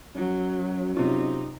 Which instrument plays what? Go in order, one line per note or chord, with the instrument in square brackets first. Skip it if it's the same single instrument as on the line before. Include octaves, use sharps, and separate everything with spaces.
[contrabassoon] F#2 [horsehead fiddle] F#3
[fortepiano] C3 F4 [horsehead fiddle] D#4